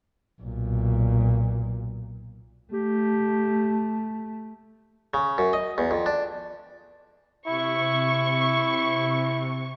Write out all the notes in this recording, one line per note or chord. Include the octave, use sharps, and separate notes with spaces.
B1 A#2
A3 G4
C#3
F#2
D#5
E2
F2
D4
C3 E4 C#6